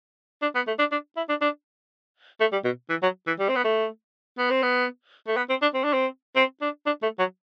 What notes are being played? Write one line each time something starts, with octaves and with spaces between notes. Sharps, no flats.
D4
B3
A3
D4
D4
E4
D4
D4
A3
G3
B2
E3
F#3
E3
G3
C4
B3
A3
B3
C4
B3
A3
B3
C4
D4
C4
D4
C4
C4
D4
D4
A3
F#3